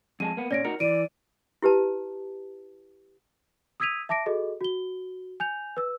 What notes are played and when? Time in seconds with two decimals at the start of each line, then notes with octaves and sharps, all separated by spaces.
0.20 F2 G#3 A5 D#7
0.37 A#3 B3
0.51 A#2 C#4 D5 A#6 D7
0.65 D#4 F#4 A#4 C#7
0.80 E3 D5 D7 D#7
1.62 E4 G4 B4 A5
3.80 D#6 E6 G#6 B6 D#7 F7
4.09 E5 A5 D6 A#6 D7
4.26 F#4 G#4 A4 D#5
4.61 F#4 G7
5.40 G#5 G6 F7
5.77 B4 E6